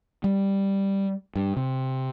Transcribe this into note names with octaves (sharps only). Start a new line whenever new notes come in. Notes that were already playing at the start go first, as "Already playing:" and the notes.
G3
G2
C3